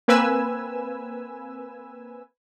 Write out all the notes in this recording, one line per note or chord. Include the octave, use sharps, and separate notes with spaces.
A#3 C4 B4 G#5 E6